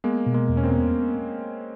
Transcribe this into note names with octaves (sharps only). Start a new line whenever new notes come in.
G#3 A#3 B3
B2
G#3 A#3
E2
C#4
A#3 C4
B3